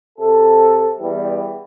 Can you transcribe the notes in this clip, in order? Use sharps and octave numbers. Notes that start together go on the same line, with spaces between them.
C3 A4
E2 E3 G3